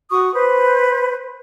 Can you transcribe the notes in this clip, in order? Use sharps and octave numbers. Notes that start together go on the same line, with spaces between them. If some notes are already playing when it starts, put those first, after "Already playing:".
F#4 C#6 D#6
B4 C5